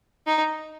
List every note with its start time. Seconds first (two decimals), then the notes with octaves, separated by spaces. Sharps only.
0.27 D#4